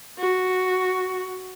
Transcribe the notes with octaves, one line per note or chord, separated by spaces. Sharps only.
F#4